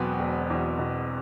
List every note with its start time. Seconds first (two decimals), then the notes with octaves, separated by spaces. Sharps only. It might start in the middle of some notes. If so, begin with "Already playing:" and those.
Already playing: E1 E2 B2 F#3 B3 C4
0.19 E1
0.50 E2
0.79 B2